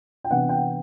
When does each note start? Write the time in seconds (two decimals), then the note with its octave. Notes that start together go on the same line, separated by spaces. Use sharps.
0.24 G5
0.30 C3 E3 B3 D4 F#5
0.49 G5